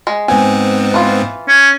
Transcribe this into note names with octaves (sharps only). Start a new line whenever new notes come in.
G#3
G#2 B3 C4 G#5
E3 F4
C#4